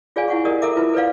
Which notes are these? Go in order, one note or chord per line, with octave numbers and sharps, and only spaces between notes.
F4 G#4 C#5 D5 F5 G#5
E4 F#5 C#6
G4 A#4 D5 D#5 D#6
A4 A#4 E5 A#5 D6
E4 F4 B4
A4 B4 C#5 D5 F5